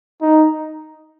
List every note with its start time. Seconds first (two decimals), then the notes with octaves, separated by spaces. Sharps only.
0.21 D#4